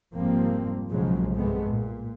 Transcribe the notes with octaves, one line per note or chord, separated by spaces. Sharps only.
F1 G#2 F3 G3 A#3 C4
B1 A#2 C#3 F3 F#3 G#3
G2 C3 G#3 A3 B3
A#2